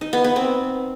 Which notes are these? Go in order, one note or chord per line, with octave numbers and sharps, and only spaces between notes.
D#4
B3
B3
C4